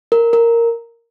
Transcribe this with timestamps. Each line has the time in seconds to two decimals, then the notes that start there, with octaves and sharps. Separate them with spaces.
0.12 A#4
0.33 A#4